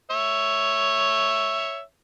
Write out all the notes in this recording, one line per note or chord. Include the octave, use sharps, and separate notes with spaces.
C#5 E5